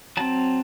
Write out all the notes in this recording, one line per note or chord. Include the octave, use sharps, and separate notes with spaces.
F#3 C4 A5